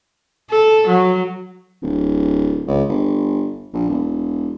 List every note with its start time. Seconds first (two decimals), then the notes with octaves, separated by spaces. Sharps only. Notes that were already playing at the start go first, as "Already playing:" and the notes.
0.50 A4
0.88 F#3
1.82 D1
2.67 C#2
2.89 G1
3.73 A#1
3.89 E1